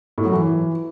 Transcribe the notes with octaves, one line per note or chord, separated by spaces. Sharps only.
A2
F#3
E3